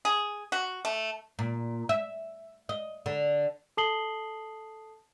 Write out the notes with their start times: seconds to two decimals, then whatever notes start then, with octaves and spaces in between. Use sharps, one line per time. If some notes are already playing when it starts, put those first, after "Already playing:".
0.05 G#4
0.52 F#4
0.85 A3
1.39 A#2
1.89 E5
2.69 D#5
3.06 D3
3.77 A4 A5 D#6 C7 F#7 G7